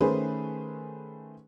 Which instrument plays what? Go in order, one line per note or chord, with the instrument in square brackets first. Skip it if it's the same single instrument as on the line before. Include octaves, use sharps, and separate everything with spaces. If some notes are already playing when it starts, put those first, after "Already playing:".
[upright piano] D#3 A3 C#4 G#4 B4 C5